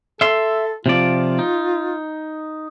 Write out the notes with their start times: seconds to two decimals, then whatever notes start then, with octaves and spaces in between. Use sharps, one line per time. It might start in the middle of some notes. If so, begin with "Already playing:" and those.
0.21 A4 E5 C6
0.86 C3 F3 F4 D5
1.39 D#4